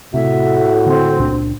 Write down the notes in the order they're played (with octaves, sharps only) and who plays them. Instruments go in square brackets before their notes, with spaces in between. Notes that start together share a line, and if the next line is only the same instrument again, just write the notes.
[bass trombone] A2 [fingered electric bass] C3 [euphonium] F#4 [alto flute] E5
[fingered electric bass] D3 [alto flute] C4
[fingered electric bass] C#2 A#2 D4